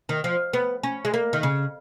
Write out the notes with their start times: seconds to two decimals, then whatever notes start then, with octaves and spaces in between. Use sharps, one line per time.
0.09 D#3
0.24 F3
0.53 B3
0.83 C#4
1.05 G#3
1.14 A#3
1.33 D#3
1.43 C#3